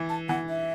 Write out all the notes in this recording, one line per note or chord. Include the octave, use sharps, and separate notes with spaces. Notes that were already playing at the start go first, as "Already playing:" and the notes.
Already playing: E3
A5
E3 F#5
E5